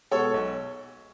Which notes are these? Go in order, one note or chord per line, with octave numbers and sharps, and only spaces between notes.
B2 G#3 B3 A4 C#5
B1